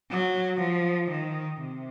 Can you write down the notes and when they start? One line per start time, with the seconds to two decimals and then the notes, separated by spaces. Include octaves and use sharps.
0.11 F#3
0.60 F3
1.10 D#3
1.60 C3